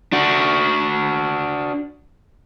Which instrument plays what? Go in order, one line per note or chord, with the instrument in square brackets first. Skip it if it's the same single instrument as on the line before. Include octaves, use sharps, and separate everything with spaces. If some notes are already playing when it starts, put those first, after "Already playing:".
[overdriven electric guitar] D4 F#4